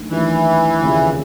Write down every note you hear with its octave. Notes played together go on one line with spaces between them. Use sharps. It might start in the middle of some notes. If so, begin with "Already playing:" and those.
Already playing: D#2 D#3 F#3 A3 D4
D#2 D#3 E3 F#3 A3 D4
F1 D#2 C#3 F3